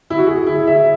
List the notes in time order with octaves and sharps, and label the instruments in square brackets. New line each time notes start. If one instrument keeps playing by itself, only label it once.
[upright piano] E4
F#4
G#4
E4
E5